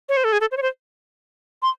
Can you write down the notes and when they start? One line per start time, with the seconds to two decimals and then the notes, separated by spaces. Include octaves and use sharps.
0.09 C#5
0.17 C5
0.24 A4
0.32 G#4
0.41 A4
0.51 C5
0.57 C#5
0.62 C5
1.62 C6